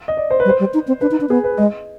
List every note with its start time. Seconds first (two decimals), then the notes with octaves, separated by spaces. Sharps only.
0.08 D#5
0.17 D5
0.31 C5
0.40 B4
0.45 G3
0.49 C5
0.60 G3
0.74 D#4
0.88 C4
1.01 D4 B4
1.11 D#4
1.21 D4
1.29 B3 G#4
1.44 B4
1.58 G#3 D#5